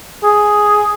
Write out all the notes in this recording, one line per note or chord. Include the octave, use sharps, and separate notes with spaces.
G#4